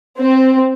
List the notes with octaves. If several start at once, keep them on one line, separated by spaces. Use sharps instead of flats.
C4